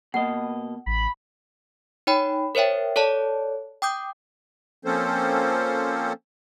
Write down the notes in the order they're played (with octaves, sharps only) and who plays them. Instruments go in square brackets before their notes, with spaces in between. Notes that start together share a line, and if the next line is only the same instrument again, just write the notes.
[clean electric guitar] B2 A#3 D#5 [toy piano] F#5
[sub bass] A1 [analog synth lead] B5
[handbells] D#4 C#5 G5 B5
A#4 C5 C#5 E5 G5
A4 C#5 D5 A5
G5 D6 D#6 G6
[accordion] F3 A#3 C4 C#4 A4 C5